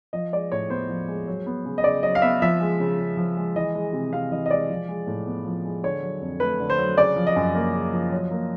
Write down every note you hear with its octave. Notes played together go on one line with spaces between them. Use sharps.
F3 D#5
G#3 D5
A2 C#5
B3 C5
F3
G#3
F#3
B3
C#3
D#5
C#3 D5
F#3 D#5
F5
B3 E5
F3 E5
G#3
C#3
C#3
F3
G#3
E3 D#5
G#3
C3
C3 F5
E3 D#5
D#5
G#3 D5
F3
G#3
A2
B3
F3
G#3
D3 C#5
F#3
F2
A3 B4
D3
C5
F#3
C#3 D5
F3
D#5
F#2
A#3
C#3
F3
F#3
A#3